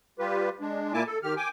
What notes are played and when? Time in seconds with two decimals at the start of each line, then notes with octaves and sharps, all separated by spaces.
0.19 G3 F4 G4 B4
0.61 G#3 D4
0.94 A#2 A#3 E4 G#5 A5 D6
1.07 A4
1.23 D#3 G4 F6
1.37 G5 G#5 D6